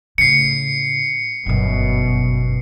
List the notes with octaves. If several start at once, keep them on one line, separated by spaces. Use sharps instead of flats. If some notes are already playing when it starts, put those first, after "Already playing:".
A2 C#3 C7 C#7
G1 F#2 B2